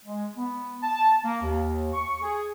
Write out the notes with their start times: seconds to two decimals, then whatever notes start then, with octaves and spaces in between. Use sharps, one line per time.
0.06 G#3
0.36 B3
0.82 A5
1.24 A#3
1.43 D#2
1.93 C#6
2.22 G#4